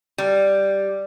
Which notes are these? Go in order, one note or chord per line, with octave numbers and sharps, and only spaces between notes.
G3